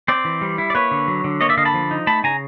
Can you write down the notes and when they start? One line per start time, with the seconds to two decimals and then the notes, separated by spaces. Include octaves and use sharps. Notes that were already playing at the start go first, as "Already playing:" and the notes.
0.08 C4 C5 D5
0.25 E3
0.42 G3
0.58 E4
0.70 D5
0.75 A#3 B4 C#5
0.91 D3
1.08 F#3
1.24 D3
1.41 A#3 C#5 D#5
1.49 D5 E5
1.57 D3 D#5 F5
1.65 A5 B5
1.74 F3
1.91 D#4
2.07 A3 A5 B5
2.24 C#3 G#5 A#5